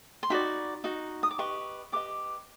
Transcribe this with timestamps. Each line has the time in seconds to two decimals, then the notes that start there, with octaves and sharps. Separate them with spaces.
0.23 C6
0.30 D#4 F#4 D5 B5
0.84 D#4 F#4
1.23 D#6
1.31 D6
1.38 G4 B4 D#5 C#6
1.92 G4 B4 D#5 D6